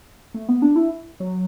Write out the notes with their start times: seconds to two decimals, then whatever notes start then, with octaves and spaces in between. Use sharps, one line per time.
0.34 A3
0.49 B3
0.62 D4
0.76 E4
1.20 F#3